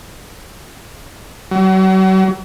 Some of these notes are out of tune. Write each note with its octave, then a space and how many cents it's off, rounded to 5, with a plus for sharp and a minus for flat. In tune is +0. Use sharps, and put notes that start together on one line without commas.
F#3 +40